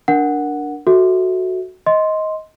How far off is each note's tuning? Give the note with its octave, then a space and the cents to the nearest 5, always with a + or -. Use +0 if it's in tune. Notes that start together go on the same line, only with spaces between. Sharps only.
D4 -5 A#4 +10 F#5 +0
F#4 +0 A4 +0 E5 -15
D#5 +15 C6 +0